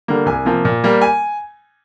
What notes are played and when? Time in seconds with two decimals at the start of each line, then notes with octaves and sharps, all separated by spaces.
0.08 D3 G3 A#3
0.26 C2 G#5
0.45 C3 F3 A#3
0.65 A#2
0.84 G3 A#3
1.01 G#5